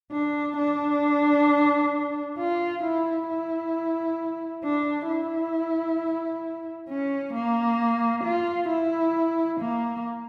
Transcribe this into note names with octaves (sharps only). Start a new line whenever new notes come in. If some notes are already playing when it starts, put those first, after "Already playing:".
D4
D4
F4
E4
E4
D4
E4
C#4
A#3
F4
E4
A#3